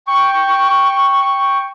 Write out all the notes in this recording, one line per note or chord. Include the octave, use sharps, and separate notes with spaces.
G5 C#6